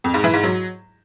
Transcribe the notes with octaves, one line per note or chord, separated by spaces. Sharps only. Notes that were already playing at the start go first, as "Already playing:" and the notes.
F2
G#2
E3
G#2
F#3